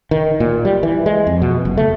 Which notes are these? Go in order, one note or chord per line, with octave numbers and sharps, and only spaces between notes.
D#3
A#2
G3
E3
G#3
F2
B2
F#1
A3